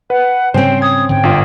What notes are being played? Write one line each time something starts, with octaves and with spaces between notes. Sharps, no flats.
B4 F#5
G#2 C#3 G3 C4 C#4 C5 G5
D#6 G#6
G#2 D3 G5
G1 F4